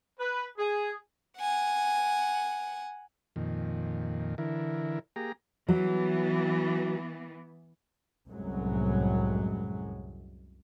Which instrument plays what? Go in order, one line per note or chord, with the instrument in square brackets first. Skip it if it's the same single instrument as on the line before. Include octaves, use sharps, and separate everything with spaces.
[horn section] B4
G#4
[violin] F#5 G#5
[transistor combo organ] F2 A#2 D#3
D3 E3 E4 A#4
A#3 G4 G#4 A#5
[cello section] E3 B3 [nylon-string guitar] F#3
[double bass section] C2 F#2 A2 F#3 G#3